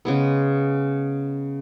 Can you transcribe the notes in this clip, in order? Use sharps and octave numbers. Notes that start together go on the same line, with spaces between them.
C#3 G#3 B3